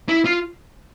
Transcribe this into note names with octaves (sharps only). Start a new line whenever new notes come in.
E4
F4